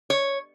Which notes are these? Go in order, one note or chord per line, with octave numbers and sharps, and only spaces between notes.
C#5